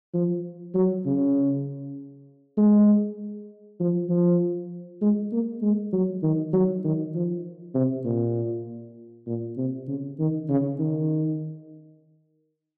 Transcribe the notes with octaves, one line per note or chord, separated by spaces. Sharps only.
F3
F#3
C#3
G#3
F3
F3
G#3
A#3
G#3
F#3
D#3
F#3
D#3
F3
C3
A#2
A#2
C3
C#3
D#3
C#3
D#3